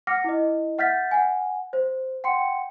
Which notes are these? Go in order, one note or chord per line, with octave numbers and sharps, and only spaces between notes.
F#5 D6 F6 A#6 C#7
E4 D#5
E5 F#5 F6 G6 A6 B6
F#5 G#5
C5
F#5 G5 C6 C#7